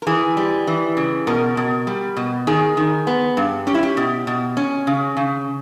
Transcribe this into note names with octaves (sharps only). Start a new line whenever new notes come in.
A#4
E3 G#4
G3
E3
C#3
B2 A#4
B2
G3
B2
D#3 G#4
D#3
B3
G2
C#4 G4
E4
G4
B2
B2
C#4
C#3
C#3